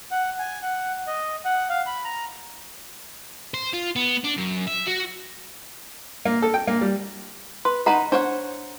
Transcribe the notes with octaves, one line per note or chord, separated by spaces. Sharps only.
F#5
G#5
F#5
D#5
F#5
F5
B5
A#5
C5
F4
B3
D4
F#2
E5
F#4
A#3
A4
G5
A#3
G3
B4 C6
D#4 B4 D#5 F#5 A#5 B5
D4 C5 C#5 F#5